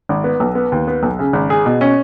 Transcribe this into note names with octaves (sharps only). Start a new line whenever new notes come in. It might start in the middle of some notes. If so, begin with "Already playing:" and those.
G#1
B3
B1
B3
D#2
B3
B1
C#3
G#1
G#4
B2
C#4